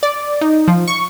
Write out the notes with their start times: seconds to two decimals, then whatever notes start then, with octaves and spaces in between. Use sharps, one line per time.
0.03 D5
0.41 D#4
0.68 F3
0.88 C#6